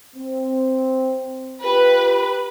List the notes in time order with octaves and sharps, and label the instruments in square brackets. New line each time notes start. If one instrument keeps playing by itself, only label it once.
[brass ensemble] C4
[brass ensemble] F4 G4 [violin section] B4